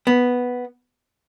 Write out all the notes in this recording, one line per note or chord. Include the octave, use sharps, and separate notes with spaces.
B3